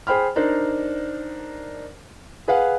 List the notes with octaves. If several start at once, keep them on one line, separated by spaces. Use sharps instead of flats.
G#4 C5 G5 B5 F6
D4 D#4 A#4 C5 D5
G#4 B4 F5 F#5